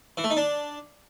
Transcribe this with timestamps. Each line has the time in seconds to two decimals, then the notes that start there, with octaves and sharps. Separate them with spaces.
0.17 E3
0.24 A3
0.30 D#4
0.37 D4